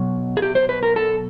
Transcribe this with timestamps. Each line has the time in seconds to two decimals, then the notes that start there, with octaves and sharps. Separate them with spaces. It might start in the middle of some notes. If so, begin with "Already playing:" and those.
Already playing: B2 F#3
0.37 G#4
0.42 G4
0.55 C5
0.69 B4
0.83 A#4
0.96 A4